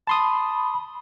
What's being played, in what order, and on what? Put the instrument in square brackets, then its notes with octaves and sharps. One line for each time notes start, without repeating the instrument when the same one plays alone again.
[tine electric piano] A5 C6 D#6 [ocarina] B5